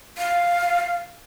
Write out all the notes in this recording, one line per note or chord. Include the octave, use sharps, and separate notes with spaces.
F5